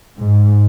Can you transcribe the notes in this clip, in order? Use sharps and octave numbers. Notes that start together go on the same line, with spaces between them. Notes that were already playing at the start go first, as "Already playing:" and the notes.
G#2